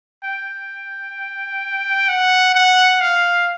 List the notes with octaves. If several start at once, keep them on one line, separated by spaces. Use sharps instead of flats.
G5
F#5
F#5
F5